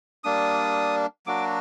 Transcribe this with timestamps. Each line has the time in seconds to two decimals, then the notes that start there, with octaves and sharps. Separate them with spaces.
0.24 G3 A#3 D4 D#6
1.26 F#3 A#3 D4 F#4 D6